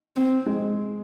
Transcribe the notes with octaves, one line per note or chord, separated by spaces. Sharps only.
C4
G#3